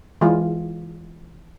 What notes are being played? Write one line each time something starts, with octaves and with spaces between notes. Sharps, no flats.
E3 G#3 F4